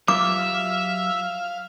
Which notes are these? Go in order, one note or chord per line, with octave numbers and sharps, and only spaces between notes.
F#3 F4 G4 E5 F5 D6